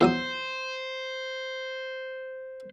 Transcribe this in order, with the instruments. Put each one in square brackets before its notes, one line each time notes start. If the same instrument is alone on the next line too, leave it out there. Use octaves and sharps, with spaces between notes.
[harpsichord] E2 F#3 D#6 [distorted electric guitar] C5